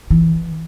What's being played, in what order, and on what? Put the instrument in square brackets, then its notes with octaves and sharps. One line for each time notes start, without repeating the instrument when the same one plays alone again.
[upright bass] E3